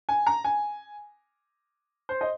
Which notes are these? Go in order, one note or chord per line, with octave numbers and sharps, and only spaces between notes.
G#5
A#5
G#5
C5
D#5